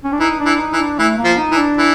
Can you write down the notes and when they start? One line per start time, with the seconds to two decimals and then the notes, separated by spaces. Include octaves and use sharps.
0.04 C#4
0.12 D4
0.20 E3 D#4
0.40 D4
0.46 E3
0.60 D#4
0.72 E3
0.79 D4
0.99 E3 A3
1.18 A#3
1.24 F3
1.38 D#4
1.51 E3
1.57 D4
1.77 E3